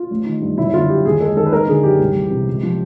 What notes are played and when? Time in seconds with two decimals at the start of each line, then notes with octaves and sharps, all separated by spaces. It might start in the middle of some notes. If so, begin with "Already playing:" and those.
Already playing: F4
0.11 A1
0.26 D#3
0.41 G2
0.58 F#1 E4
0.73 D3 F4
0.89 F#2 G4
1.05 D#2 G#4
1.20 G#3 A4
1.37 D#3 A4
1.46 B4
1.52 G#1 A#4
1.68 D3 G#4
1.83 F#2 G4
1.99 C2
2.15 E3
2.31 C3
2.47 C#2
2.63 F3